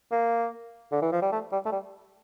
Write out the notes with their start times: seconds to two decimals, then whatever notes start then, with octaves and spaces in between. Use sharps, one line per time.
0.12 A#3
0.92 D3
1.02 E3
1.12 F3
1.22 G3
1.32 A3
1.52 G3
1.65 A3
1.72 G3